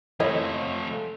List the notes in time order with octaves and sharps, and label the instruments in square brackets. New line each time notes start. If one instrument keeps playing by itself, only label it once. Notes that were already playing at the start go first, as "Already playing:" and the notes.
[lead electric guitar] F2 A3 [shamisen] E4 C#5 D#5